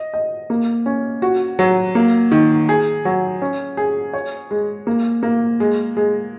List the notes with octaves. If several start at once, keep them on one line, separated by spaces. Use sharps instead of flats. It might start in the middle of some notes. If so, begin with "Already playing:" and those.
Already playing: D#5
D#5
A#3
C#4
F#4
F#3
A#3
D#3
G#4
F#3
C#4
G#4
C#5
G#3
A#3
A#3
G#3
G#3